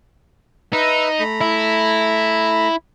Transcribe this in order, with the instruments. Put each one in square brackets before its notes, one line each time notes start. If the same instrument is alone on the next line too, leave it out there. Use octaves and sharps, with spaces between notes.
[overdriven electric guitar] D#4 [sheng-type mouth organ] B4 E5 E6
[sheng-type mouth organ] A3 A#5 B5
[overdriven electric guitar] E4